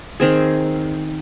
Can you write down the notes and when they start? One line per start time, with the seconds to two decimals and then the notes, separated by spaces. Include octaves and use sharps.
0.20 D#3 C4 G#4